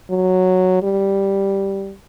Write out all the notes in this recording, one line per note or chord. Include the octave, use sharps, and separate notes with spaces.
F#3
G3